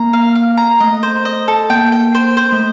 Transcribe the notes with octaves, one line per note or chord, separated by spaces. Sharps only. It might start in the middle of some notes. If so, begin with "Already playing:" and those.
Already playing: A#3 A#5
F5
F5
A#5
A3 D#5
C5
D#5
A4
A#3 G5
G5
C5
C5
A3